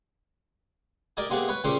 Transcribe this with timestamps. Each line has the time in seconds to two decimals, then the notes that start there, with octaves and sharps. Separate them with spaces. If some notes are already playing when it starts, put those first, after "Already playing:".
1.17 G4 A#4 D5 D#5 G#5
1.30 C3 A#3 B3 G4 G#4 G#5
1.48 B4 C#5
1.64 A#2 C#3 C4 C#4 G4